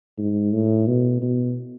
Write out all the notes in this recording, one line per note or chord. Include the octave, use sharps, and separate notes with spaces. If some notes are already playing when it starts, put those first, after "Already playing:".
G#2
A2
B2
B2